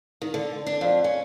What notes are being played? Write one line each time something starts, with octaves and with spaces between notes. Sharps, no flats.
D#3
D3
D4
F2
C#4